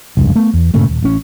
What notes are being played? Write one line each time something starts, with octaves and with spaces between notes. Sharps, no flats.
F1 C#2 G2
A3 B3
E2
G2 A#2 C#3 A3
D#1
A1 C#4